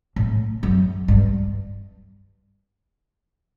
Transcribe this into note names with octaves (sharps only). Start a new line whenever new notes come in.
A2
F#2
G2